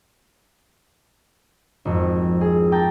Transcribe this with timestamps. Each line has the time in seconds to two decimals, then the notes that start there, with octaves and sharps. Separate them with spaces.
1.85 G#1 F2
2.41 G#4
2.72 G5 A5 A#5 D6